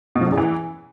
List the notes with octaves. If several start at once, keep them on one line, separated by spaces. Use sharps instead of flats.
B2
F3
F#2
E2
E3